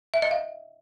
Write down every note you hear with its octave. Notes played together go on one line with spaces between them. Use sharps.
E5
D#5
F5